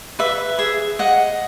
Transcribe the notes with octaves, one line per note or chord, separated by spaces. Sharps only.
B4 E5
G#4 E5
D#5 F#5